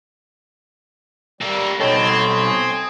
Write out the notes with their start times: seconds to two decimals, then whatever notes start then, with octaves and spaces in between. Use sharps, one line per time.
1.41 G3 A#3 A4
1.80 B2 C4 A4 C#5 D#5
2.45 G#5 D#6